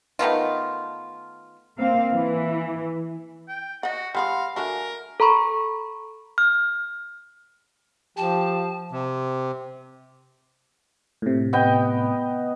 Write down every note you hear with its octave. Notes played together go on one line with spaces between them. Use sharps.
D#3 A3 B3 F4
A#3 C4 F5
E3
G5
F#4 D#5 F#5
G3 B3 G#4 F5 F#5 B5 C6
D3 A3 D4 F#4 A#4 G#5
A4 A#5 B5 C#6
F6
F3 G4 A5
C3
A2 C3
B3 D#5 G5